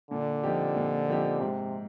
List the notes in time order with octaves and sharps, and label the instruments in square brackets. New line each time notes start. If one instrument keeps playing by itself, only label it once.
[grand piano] A#2 [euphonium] D3
[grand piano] F3 C4 D#4 G4
A#2
F3 C4 D#4 G4
[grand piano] G#2 [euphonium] C3